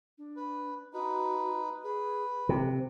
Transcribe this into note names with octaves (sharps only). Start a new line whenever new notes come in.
D4
B4
D#4 F#4 B4
G#4 B4
C3 C4